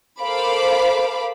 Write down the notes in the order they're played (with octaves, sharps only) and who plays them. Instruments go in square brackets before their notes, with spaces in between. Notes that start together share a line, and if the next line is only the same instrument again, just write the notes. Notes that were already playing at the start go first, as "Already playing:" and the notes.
[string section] A4 A#4 C5 F5 B5 D6